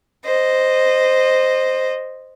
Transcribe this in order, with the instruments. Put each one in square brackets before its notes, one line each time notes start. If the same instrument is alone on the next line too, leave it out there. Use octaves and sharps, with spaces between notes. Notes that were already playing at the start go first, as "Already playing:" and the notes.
[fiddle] C5 D#5